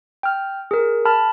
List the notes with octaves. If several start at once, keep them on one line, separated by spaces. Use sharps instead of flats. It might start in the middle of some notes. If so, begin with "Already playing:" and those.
G5 F6
G#4 A#4
A5 B5 F6